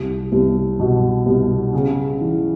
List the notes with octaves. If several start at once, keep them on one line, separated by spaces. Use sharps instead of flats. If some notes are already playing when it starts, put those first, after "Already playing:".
Already playing: C2
C2
B2
C2
C#3
E3